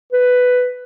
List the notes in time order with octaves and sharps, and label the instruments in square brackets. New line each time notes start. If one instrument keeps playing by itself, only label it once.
[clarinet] B4